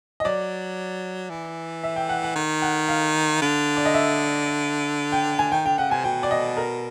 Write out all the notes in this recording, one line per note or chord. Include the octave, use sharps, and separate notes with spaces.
D#5
F#3 D5
E3
E5
G5
F#5
F#5
D#3
F#5
F5
D3
D5
D#5
E5
G5
G#5
D#3 G5
D3 G5
C#3 F#5
C3 G#5
B2 G5
D5
D#5
A#4